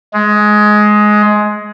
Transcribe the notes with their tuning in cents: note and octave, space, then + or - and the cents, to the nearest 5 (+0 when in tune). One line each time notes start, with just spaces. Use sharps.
G#3 +15